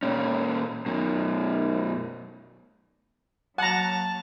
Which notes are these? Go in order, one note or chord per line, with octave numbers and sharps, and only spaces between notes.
A#2 C#4
F#2 B2
F#3 A#3 F#5 A5 A#5